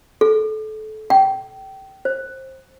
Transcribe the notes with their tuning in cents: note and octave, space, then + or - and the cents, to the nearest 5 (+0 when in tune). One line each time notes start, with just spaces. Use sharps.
A4 -25
G5 -25
C5 +15